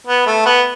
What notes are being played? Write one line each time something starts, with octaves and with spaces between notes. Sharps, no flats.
B3
A3
B3